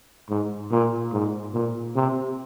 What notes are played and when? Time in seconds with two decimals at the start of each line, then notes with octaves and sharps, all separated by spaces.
0.30 G#2
0.71 A#2
1.12 G#2
1.53 A#2
1.95 C3